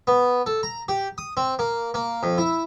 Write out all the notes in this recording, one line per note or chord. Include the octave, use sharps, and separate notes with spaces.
B3
A4
A#5
G4
D#6
C4
A#3
A#3
F2
E4